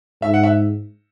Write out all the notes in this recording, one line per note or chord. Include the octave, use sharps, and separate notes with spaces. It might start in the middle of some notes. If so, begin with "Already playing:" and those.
G#2 E5
F#5
E5